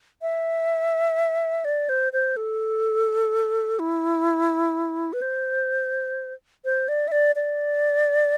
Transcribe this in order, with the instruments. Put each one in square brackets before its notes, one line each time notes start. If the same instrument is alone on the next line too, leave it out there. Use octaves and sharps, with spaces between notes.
[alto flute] E5
D5
C5
C5
A4
E4
B4
C5
C5
D5
E5
D5
D5